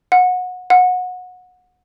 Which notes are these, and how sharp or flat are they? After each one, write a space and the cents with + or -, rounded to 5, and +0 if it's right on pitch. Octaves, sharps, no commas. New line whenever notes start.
F#5 -25
F#5 -25